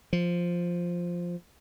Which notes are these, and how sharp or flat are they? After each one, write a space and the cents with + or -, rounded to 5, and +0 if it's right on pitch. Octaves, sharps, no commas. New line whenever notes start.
F3 +0